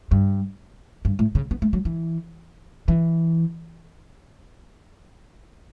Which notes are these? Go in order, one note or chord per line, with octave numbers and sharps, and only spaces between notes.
G2
G2
A2
C#3
B3
A3
F#3
E3
E3